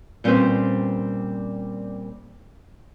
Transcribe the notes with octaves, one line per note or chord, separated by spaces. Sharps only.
A#2 G3 C4 C#4 B4 C5